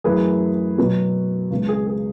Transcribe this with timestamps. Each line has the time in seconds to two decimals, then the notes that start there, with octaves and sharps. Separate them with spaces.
0.04 F#2 E3 A3 G#4 B4
0.78 B2 F#3 B3
1.51 C#2 C#3 G#3 B3
1.69 G#4
1.87 G#4